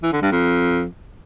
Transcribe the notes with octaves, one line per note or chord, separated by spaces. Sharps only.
E3
D3
G2
F2